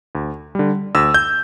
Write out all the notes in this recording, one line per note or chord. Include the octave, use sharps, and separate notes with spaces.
D2
D3 G3
D2 E6
G6